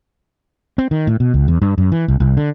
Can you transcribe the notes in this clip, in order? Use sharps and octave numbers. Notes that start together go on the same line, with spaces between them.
C4
D#3
A2
B2
C#2
E2
G2
F#2
E3
C2
C2
D3